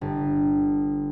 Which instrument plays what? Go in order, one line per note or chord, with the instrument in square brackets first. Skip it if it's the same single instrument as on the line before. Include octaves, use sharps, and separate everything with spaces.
[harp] G1